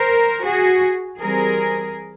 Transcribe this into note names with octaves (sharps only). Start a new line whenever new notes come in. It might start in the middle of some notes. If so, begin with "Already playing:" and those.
Already playing: A#4 C5
F#4 G#4
E3 G3 C4 G#4 A#4